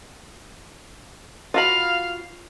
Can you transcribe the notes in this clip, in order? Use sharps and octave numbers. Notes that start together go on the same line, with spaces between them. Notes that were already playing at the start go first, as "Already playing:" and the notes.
F4 F#4 F5 B5